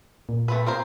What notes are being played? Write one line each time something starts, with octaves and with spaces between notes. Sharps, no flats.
A#2
A3 C4 B4
C4 A#4 C5